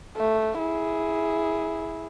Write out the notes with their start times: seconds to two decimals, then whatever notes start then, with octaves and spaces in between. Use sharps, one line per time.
0.17 A3
0.58 E4 G#4